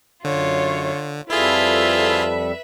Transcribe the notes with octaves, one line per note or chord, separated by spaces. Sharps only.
F#2 D3 F4 C#5
F2 G3 E4 F4 G#4 A4 B4 E5